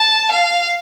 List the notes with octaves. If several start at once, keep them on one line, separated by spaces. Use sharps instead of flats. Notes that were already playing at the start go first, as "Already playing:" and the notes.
Already playing: A5
F5